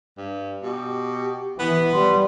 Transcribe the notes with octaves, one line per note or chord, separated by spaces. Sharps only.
G2
B2 G4
E3 B3
G3 C6